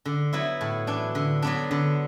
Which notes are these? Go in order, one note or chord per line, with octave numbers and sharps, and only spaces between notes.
D3
F#3 B3 E4
A2
E3 D4
D3
F#3 B3 D4
D3